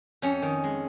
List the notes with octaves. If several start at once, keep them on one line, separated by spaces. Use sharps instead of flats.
F2 C#4
D#3
G#3